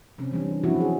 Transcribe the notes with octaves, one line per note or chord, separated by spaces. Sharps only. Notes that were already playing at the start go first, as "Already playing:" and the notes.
C3 C4 C#4
E3 G3 D4
G3
F3 F#3 C4 C#4 E4 F#4
G#4